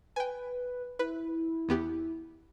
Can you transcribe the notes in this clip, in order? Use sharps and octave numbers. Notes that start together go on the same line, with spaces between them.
B4 G5 G#5
E4 B4
E2 B3 G4